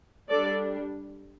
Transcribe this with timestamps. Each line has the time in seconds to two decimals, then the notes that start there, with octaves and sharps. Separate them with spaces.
0.30 G3 D4 A4 D5